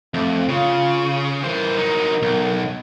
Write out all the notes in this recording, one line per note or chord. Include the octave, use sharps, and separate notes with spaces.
F2 A3
C#3 F4
E3 A#4 C5
F#3 D#4
B1